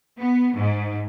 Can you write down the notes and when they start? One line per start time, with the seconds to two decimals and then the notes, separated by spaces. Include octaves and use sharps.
0.20 B3
0.55 G#2